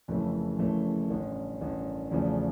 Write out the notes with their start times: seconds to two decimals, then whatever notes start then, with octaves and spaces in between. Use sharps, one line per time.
0.08 F#1 F2 C#3 E3 A3
0.58 F#1 F2 C#3 E3 A3
1.10 A1 G2 D3
1.61 A1 G2 D3
2.11 E2 C#3 F3 A3 D4